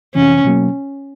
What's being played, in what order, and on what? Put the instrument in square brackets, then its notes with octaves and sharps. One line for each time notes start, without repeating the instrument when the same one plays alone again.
[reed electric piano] F2 C3 E3 [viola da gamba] C#4
[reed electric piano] B2 F#3 A#3